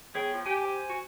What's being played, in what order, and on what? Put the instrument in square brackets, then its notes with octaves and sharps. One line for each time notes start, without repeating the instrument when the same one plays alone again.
[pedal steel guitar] B3 C#5 G5 [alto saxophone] G#4
[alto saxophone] F3
[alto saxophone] G4 [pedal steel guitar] G#5
[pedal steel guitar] C5 G#5
[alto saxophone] F#4